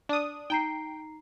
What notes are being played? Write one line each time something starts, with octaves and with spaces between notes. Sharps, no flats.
D4 D#6
D#4 G5 A#5 C7